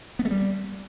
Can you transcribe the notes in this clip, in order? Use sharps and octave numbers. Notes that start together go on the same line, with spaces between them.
B3
A3
G3